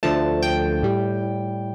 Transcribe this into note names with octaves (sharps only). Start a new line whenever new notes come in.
D2 D3 F3 A3 A5
G5
A2 G3